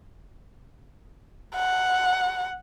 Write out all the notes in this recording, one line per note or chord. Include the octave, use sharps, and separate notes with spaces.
F#5